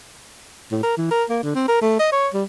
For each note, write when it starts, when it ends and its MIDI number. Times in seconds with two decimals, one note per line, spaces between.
0.71 0.78 45
0.83 0.93 70
0.98 1.08 52
1.11 1.24 70
1.30 1.39 58
1.43 1.54 50
1.55 1.66 60
1.68 1.78 70
1.82 1.96 57
1.99 2.11 75
2.12 2.28 73
2.34 2.44 55